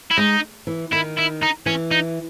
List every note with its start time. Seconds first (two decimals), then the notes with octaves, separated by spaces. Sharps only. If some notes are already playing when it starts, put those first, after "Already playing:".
0.11 E4
0.18 G#3 D#4
0.67 E3
0.92 D#3 E4
1.17 E4
1.42 D#4
1.66 E3 C#4
1.91 D#4